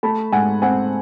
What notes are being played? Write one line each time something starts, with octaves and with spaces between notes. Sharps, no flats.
A3 A5 B5
G#2 F#5 G#5
C4 F#5 G#5